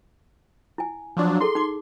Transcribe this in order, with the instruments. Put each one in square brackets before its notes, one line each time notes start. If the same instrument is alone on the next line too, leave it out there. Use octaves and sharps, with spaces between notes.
[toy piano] E4 G#5
[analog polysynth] F3 F#3 D4
[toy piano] E4 G#4 A4 [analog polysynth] C6
[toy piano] D#4 D6